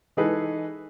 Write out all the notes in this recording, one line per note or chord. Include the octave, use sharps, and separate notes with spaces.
E3 G#3 D#4 G#4 A4 B4